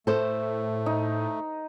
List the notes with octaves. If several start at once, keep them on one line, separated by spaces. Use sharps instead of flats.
A2 A3 A4 C5
D#4